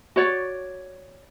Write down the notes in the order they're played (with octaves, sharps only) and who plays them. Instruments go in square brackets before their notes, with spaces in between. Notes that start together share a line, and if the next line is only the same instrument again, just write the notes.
[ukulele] F#4 C#5 D5